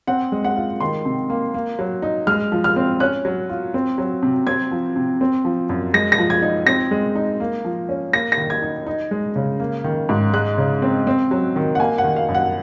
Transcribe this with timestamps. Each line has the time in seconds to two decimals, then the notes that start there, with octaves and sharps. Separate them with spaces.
0.07 C4 F#5
0.32 G#3
0.45 F#5
0.56 F4
0.80 D#3 C6
1.05 C3
1.30 A#3
1.54 A#3
1.79 F#3
2.02 D#4
2.27 G#3 F6
2.52 F3
2.64 F6
2.76 C4
3.00 C#4 F#6
3.25 F#3
3.49 F4
3.74 C4
3.98 F#3
4.23 C3
4.47 C4 G#6
4.71 F3
4.96 C3
5.21 C4
5.45 F3
5.69 F#2
5.94 G#3 A#6
6.12 A#6
6.18 F3
6.30 G#6
6.42 D#4
6.67 C4 A#6
6.91 G#3
7.15 D#4
7.40 A#3
7.65 F3
7.89 C#4
8.13 A#3 A#6
8.32 A#6
8.37 D#3
8.50 G#6
8.62 D#4
8.87 D#4
9.11 G#3
9.36 C#3
9.60 A#3
9.84 D#3
10.09 G#2
10.33 G#3 F#6
10.58 C#3
10.82 C4
11.07 C4
11.31 F#3
11.56 D#3
11.75 F#5
11.80 A#3 G#5
11.98 F#5
12.04 D#3
12.16 F5
12.28 F#2
12.35 F#5